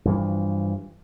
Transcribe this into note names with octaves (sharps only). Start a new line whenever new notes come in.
G2 E3 F3